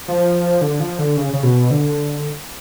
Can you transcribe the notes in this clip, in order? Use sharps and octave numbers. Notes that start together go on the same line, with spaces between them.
F3
D3
F3
D3
C#3
C#3
B2
D3